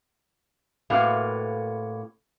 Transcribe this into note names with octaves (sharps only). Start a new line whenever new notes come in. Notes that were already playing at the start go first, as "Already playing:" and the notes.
A2 C3 A#3 F#4 B4 F5